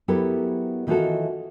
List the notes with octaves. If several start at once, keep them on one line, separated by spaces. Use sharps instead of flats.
F#3 B3 E4 G4 A4 A#4
D#3 E3 D#4 F4 F#4 A4